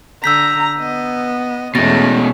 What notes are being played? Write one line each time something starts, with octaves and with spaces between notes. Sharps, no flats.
D3 A#5 E6 G6 B6
B3 D#5
E2 B2 G#3 A3 C#4 A6 A#6